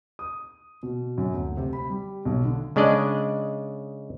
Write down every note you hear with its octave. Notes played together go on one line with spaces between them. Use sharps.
D#6
B2
F#2
D2
C3
B5
G3
B1
D3
C#3 G#3 D4 D5 D#5